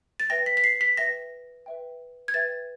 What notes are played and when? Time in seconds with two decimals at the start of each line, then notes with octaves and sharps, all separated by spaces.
0.20 A6
0.30 B4 E5 G5 A#6
0.46 B6
0.57 B6
0.64 C7
0.81 B6
0.97 B4 E5 G5 A#6
1.66 B4 E5 G5
2.28 G#6
2.34 B4 E5 G5 A6